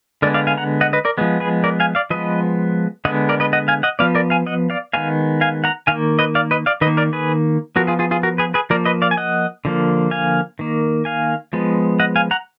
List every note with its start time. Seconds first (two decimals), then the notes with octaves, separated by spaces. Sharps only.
0.22 D3 G#3 B3 A#4 D5
0.34 D5 F5
0.47 F5 G#5
0.58 F#5 A#5
0.81 D#5 F#5
0.93 B4 D#5
1.05 A#4 D5
1.18 F3 G#3 B3
1.40 G#4 B4
1.64 A#4 D5
1.80 F5 G#5
1.95 D5 F5
2.10 F3 G#3 B3 B4 D#5
3.05 D3 G#3 B3 D#5 F#5
3.29 A#4 D5
3.40 B4 D#5
3.53 D#5 F#5
3.68 F5 G#5
3.83 D#5 F#5
3.99 F3 B3 D5 F5
4.15 A#4 D5
4.30 F5 G#5
4.47 D#5 F#5
4.70 D5 F5
4.93 D#3 G#3 B3 F5 G#5
5.41 F5 G#5
5.64 F#5 A#5
5.87 D#3 A#3 F5 G#5
6.19 B4 D#5
6.35 D5 F5
6.51 B4 D#5
6.66 D5 F5
6.81 D#3 B4 D#5
6.87 A#3
6.97 A#4 D5
7.13 G#4 B4
7.76 F3 B3 F#4 A#4
7.87 F4 G#4
7.99 F4 G#4
8.11 F4 G#4
8.23 F#4 A#4
8.38 G#4 B4
8.54 G#4 B4
8.70 F3 A#3 A#4 D5
8.85 B4 D#5
9.02 D5 F5
9.11 G#5
9.17 D#5 F#5
9.65 D3 F3 A#3
10.11 F5 G#5
10.59 D#3 A#3
11.05 F5 G#5
11.53 F3 G#3 B3
12.00 D#5 F#5
12.16 F5 G#5
12.31 F#5 A#5